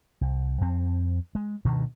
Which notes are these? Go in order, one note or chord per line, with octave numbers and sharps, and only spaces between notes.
C2
F2 C4
G#3
D2 G2 B2 D#3